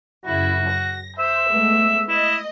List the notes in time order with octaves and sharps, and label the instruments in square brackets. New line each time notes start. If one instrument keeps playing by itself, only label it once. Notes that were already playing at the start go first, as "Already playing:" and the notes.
[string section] F#2 C#3 E4 [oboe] F#4
[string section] A#6
[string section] C5 [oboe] E5
[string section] G#3 A3 B3
[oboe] E4 [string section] D#5